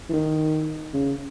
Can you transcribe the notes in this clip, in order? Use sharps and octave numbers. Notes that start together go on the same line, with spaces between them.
E3
D#3
C#3